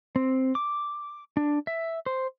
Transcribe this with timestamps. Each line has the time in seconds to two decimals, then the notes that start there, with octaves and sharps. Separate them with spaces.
0.16 C4
0.55 D6
1.37 D4
1.67 E5
2.06 C5